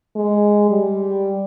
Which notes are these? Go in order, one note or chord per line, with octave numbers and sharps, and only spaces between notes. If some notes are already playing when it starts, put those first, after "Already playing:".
G#3
G3